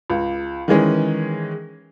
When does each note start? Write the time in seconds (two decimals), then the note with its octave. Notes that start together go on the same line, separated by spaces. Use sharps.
0.10 C#2
0.68 D#3 E3 G#3 C#4